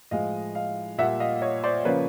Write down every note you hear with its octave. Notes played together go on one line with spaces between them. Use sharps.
A2 F3 G#3 D#5 F5
D#5 F5
A#2 G3 A#3 E5 F#5
D#5 F5
C#5 D#5
C5 D5
C#3 F3 A#3 B4 C#5